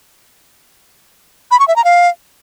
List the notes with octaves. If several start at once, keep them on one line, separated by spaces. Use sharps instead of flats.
B5
C#6
E5
A#5
F5